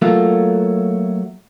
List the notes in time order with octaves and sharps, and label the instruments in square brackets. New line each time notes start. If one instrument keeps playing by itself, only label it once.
[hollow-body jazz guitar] F#3 A3 A#3 F4